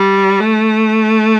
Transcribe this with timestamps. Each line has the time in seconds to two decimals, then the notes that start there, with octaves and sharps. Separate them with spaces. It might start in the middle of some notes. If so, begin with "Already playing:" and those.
Already playing: G3
0.40 A3